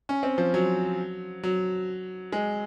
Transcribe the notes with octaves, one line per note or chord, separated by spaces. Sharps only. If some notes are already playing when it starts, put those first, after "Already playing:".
C#4
C4
F3
F#3
F#3
G#3